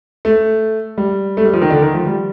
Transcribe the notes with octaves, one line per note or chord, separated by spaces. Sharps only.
A3
G3
A3
G3
F3
D#3
D3
D#3
F3
G3